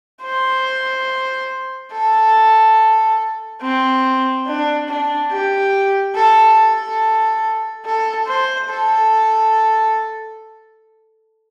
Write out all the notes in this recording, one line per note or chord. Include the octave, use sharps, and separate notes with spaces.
C5
A4
C4
D4
D4
G4
A4
A4
A4
C5
A4